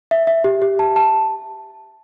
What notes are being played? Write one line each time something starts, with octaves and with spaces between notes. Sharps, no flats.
E5
E5
G4
G4
A5
A5